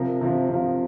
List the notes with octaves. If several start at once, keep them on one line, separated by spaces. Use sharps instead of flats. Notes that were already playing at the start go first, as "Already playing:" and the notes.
Already playing: C3 F3 A#4
C3 F3
C3 F3